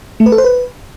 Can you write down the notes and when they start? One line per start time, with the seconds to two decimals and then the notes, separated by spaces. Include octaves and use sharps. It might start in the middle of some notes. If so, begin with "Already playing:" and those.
0.20 A3
0.26 B4
0.32 A4
0.38 C5
0.44 B4